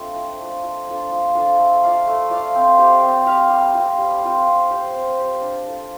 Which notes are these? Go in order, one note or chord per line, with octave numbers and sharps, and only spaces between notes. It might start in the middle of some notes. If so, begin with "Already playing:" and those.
Already playing: A3 C4 D4 F4
F3
A3 D4 F4
F3
D4 F4 A4
F3
D4 F4 A4
A3
F4 D5 F5
A3
F4 D5 F5
C4
G4 D5 F5
C4
G4 D5 F5
G3
C4 F4
G3
C4 F4
C4
G4 C5 F5
C4
G4 C5 F5
D4
F4 A4